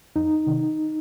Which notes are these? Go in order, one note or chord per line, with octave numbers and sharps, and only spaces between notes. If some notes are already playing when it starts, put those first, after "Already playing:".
F2 D#4
C3 D#3